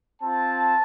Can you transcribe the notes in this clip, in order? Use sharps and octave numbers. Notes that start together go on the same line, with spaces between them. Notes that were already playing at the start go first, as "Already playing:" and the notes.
C4 F4 A5